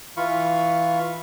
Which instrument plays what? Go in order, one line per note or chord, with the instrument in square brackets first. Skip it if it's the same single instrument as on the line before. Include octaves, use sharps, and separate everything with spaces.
[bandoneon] E3 F4 F5 B5 C#6